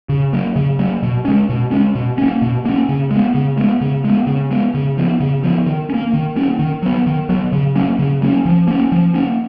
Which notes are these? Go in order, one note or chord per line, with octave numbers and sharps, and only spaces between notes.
C#3
F#3 A#3
C#3
F#3 A#3
B2
G#3 C#4
B2
G#3 C#4
B2
A#3 C#4
B2
A#3 C#4
C#3
G#3 B3
C#3
G#3 B3
C#3
G#3 B3
C#3
G#3 B3
C#3
F3 B3
C#3
F3 B3
D#3
C#4
A#3
D#3
A#3 C#4
D#3
F#3 B3
D#3
F#3 B3
C#3
F#3 A#3 C#4
C#3
F#3 A#3 C#4
F3
A#3 C#4
F3
A#3 C#4